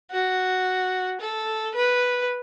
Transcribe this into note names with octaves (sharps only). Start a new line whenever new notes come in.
F#4
A4
B4